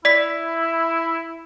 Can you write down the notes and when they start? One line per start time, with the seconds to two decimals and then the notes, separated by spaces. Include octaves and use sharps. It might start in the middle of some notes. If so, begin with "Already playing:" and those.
0.05 E4 D5 B6